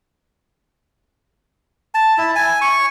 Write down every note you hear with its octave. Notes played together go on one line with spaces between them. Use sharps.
A5
E4
G#5
C#6